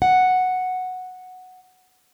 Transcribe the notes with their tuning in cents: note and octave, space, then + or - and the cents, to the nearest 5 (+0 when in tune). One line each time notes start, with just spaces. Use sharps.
F#5 -5